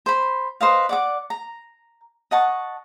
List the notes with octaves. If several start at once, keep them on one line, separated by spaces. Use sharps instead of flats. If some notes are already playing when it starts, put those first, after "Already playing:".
C5 B5
B4 C5 D#5 F5
D5 F#5 D6
A#5
D#5 F#5 A5 C#6